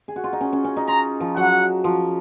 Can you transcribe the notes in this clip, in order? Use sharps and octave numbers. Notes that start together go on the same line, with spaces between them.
G#4
F#4
F4
D#4
C#4
C#4
C#4
D#4
F4 A#5
F3
F#3 F#5
F3